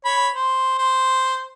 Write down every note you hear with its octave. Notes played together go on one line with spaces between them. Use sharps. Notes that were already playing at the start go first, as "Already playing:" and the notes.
C#5 B5
C5
C5